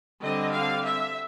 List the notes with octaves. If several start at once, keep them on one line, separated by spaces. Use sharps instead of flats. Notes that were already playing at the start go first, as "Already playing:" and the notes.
D3 G3 C4 D#5
F5
E5